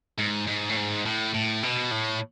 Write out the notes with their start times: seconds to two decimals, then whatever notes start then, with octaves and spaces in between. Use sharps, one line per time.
0.18 G#2
0.47 G#2
0.69 A2
0.76 G#2
1.06 A2
1.34 A2
1.63 B2
1.91 A2